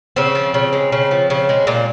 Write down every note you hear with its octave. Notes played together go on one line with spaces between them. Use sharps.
C#3 C4
F3
C#3
G#3
C#3
F3
C#3
G#3
A#2